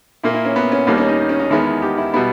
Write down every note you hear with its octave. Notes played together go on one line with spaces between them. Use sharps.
A#2 A#3 E4
E4
C#4
B3
C#4
D#2 D#3 G3 A#3 B3
C#4
D#4
D#4
C#4
D#4
E2 D#3 G#3 B3 E4
E4
G4
E4
B2 G3 B3 E4